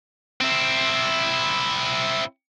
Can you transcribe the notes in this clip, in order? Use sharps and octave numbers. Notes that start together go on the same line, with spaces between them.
C4 E4